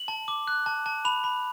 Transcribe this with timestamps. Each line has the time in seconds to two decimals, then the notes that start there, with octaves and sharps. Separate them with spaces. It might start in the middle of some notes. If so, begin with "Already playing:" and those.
Already playing: F#7
0.08 A5
0.28 D6
0.48 F#6
0.66 A5
0.86 A5
1.05 B5 F7
1.24 B5